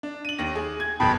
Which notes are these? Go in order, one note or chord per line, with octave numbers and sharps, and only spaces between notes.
D4
D#7 F#7
D#2 A#6
G#4
G#6
F#1 B2 G5 A5 B5